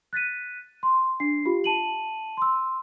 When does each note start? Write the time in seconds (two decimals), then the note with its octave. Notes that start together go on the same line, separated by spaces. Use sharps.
0.13 F#6 A6 B6 D#7
0.83 C6
1.20 D4 C7
1.45 F4 G4
1.64 A5 D#7 F#7
2.37 C6 E6